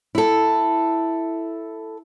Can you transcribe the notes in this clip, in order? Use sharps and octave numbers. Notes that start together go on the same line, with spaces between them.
E4 A4